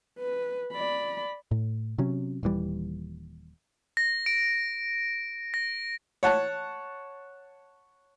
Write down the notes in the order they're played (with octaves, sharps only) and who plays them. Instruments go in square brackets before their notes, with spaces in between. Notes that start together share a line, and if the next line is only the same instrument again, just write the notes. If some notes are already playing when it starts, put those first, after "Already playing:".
[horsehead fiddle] B4
D5 B5
[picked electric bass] A2
C3 F#3 C#4
D#1 D#2 E3 G3
[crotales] A#6
D7
A#6
[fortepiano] C#5 F#5 A5